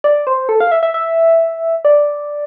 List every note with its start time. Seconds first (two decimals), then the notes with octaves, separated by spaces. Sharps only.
0.04 D5
0.27 C5
0.49 A4
0.60 F5
0.72 E5
0.83 E5
0.94 E5
1.85 D5